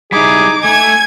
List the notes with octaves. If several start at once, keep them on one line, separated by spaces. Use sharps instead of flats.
G3 D#4 E4 G#4 D6
A3 G#5 G#6